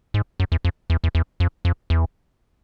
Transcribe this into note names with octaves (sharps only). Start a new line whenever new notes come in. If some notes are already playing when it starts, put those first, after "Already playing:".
G#2
F#2
E2
F2
E2
E2
E2
F2
F2
E2